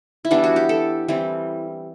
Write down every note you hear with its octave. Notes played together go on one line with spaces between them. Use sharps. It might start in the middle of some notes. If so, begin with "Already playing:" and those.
E4
E3 G3 B3 D4
F#4
G4
A4
E3 G3 C4